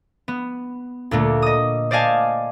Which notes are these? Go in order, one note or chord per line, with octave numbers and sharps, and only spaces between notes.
B3
D2 A#2 A3 A#3
D#5 D#6
C5 D5 D#5 F5 G#5 A5